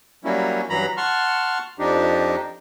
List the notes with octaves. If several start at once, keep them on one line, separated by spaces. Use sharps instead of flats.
F#3 G3 A#3 C#4 E4
G2 E3 F#3 A#5 B5
F#5 A5 C6 C#6 F6
F2 F3 D4 D#4 G4